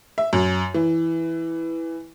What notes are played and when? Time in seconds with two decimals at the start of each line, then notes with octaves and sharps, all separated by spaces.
0.18 E5
0.33 F#2
0.74 E3